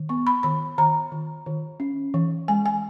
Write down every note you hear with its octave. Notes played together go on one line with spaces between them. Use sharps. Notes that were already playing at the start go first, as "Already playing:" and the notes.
Already playing: D#3
B3 C#6
B5
D#3 B5
D#3 A#5
D#3
D#3
C#4
E3
G#3 G#5
G#5